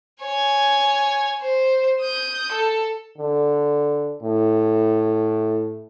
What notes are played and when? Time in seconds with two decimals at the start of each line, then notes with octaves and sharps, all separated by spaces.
0.23 C#5 G#5
1.42 C5
2.01 D#6 G6
2.52 A4
3.18 D3
4.22 A2